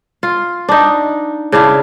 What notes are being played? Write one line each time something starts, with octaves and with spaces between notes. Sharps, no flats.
F4
D4 D#4
C#3 D4 E4 F5